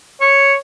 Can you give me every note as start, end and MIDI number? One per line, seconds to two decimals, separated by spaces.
0.21 0.54 73